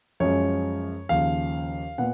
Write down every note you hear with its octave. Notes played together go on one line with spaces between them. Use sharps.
F#2 F3 G#3 C#4 C#5
D#2 C#3 F3 F5
A#2 B3 F#5